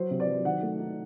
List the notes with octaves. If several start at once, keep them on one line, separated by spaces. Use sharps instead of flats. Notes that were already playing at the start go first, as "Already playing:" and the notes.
Already playing: F#3 C5
C3
D5
F#3
D#3 F#5
A3
D#4